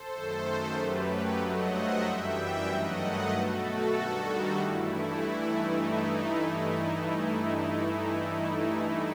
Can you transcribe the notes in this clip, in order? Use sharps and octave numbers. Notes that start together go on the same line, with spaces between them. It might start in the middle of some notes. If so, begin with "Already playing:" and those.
Already playing: A4 C5
F#2 D#3 A3
F#2 F#3 A3 G4 B4
G4 B4
G2 F#3 A3 D#5 F#5
C5 E5
F#2 E3 G3 E5 G5
G2 D#3 F#3 A3 D#5 F#5
B4 D#5
B2 A3 F#4 A4
G2 D#3 G3
D#4 F#4
G2 E3 A3 E4
G2 E3 A3
D#4